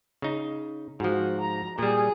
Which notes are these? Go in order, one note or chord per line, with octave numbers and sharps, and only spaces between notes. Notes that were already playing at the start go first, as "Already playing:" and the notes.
C#3 D#4
G#2 F3 F#4
A#5
A#2 G3 G#4